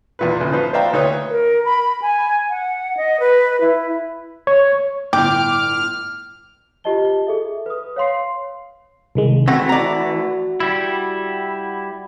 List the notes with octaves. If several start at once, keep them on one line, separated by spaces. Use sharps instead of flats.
E2 A#2 B4
A1 D2
F3 D#4 B4 C5
C5 D5 E5 F5 G5 A#5
D2 D#4 B4 C#5 D#6
A#4
B5
G#5
F#5
D#5
B4
E4
C#5
G1 A2 G5 D6 F6 G6
F4 G4 C5 D#5 A5 G7
G#4 A4 E5
B4 D#6
C#5 F5 C6 C7
C2 D#3 G#3
E3 A3 C4 F#4 F#5
D5 A#5
G3 E4